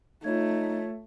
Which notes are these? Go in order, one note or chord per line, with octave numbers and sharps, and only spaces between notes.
A3 D#4 F4 C#5 G#6